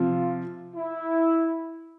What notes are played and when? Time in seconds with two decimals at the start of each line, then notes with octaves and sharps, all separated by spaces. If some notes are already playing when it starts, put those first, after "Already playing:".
Already playing: C3 F3 F4
0.76 E4